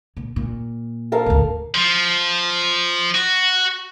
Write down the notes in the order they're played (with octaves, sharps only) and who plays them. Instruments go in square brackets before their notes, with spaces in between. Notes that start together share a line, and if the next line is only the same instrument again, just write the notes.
[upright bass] A#2
A#2
[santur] A4 A#4 F5
[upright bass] A1 D2
[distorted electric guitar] F3
F#4